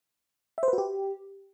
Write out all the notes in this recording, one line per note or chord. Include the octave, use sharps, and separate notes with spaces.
E5
C5
B4
F#4
G4